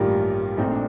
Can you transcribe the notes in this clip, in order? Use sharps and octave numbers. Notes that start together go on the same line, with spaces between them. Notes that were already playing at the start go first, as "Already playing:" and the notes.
Already playing: A1 G2 D#3 G3 A#3 F4
A#1 A#2 A3 C4 D#4
D4